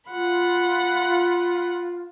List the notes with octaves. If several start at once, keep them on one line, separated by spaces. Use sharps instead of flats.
F4 F#5 B5 C6